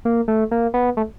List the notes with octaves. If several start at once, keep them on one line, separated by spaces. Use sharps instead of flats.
A#3
A3
A#3
B3
A3